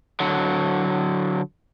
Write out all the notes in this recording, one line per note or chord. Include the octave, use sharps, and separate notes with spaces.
D3 F#3